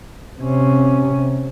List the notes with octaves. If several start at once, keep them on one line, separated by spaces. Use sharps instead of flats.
C3 C#4